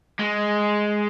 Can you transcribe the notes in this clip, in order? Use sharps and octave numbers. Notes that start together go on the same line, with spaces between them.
G#3